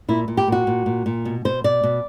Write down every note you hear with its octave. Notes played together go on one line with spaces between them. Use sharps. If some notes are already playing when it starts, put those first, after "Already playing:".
A#2 E4
A#2
G4
A#2 F#4
A#2
A#2
A#2
B2
B2 C5
B2 D5
B2